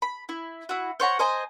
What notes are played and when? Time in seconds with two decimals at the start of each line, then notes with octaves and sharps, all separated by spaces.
0.02 B5
0.29 E4
0.69 E4 F#4
1.00 C5 C#5 F#5 A#5
1.19 C5 D#5 G#5 A#5